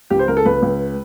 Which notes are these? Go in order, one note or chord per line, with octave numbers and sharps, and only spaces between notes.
C#2 G4
C5
C#2 A#4
A4
C#2 B4
C#2